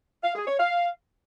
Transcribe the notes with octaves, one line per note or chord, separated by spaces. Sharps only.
F5
G#4
C#5
F5